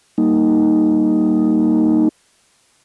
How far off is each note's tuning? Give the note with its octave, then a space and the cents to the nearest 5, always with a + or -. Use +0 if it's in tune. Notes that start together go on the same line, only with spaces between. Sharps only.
G3 -20 A#3 -10 D#4 +0